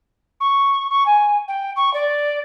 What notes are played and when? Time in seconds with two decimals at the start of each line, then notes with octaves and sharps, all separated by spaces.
0.40 C#6
0.90 C#6
1.06 G#5
1.48 G5
1.76 C#6
1.93 D5